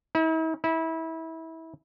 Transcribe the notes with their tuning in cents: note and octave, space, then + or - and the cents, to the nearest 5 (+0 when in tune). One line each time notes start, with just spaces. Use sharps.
E4 -45
E4 -25